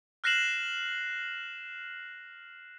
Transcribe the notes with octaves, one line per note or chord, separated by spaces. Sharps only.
F6 F#6 A#6 C7 E7 F#7